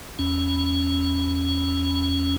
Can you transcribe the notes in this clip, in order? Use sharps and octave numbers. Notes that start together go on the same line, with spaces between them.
E2 C#4